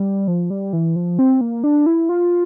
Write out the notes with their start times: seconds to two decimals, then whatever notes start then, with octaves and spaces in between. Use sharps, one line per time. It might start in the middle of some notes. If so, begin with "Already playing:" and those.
Already playing: G3
0.28 F3
0.50 G3
0.73 E3
0.96 F3
1.19 C4
1.41 A#3
1.64 D4
1.86 E4
2.09 F4